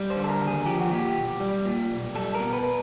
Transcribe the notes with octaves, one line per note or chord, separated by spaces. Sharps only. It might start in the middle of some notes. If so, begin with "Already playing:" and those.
Already playing: G3
C5
D3
A4
A#4
D#2
G#4
F3 G4
F#4
A#2 G4
B1
G3
A#2
B1
G3 A4
A#4
B2
B4